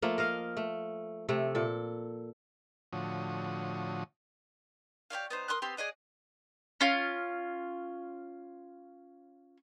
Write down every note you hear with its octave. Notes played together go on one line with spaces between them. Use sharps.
F3 A3 A#3
A#4 D#5 F5
A3
C3 A3
A#2 A4
A2 D3 F3 F#4 C#5 D#6
G4 C#5 D5 F5
B3 D#4 C5
A#4 C6 D#6 F#6
B3 C4 G4 C6
G#4 D5 D#5 F#5
C#4 F4